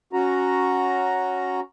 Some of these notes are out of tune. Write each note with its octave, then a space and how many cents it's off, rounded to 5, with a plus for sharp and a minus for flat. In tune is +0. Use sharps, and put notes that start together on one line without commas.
C#4 +0 F#4 -5 A#5 +0